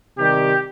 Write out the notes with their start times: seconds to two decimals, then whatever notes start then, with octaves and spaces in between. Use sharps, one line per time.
0.17 C3 D#3 G3 G4